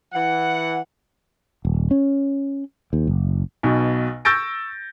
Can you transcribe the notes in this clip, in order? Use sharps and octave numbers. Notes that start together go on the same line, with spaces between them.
E3 F#5
D#1
C#4
D#2
F#1
B1 B2
C#6 E6 G6 A6 A#6 D7